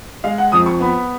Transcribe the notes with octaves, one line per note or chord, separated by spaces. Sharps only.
G#3 F5
F#5
F2 D#6
C#6
B3 B5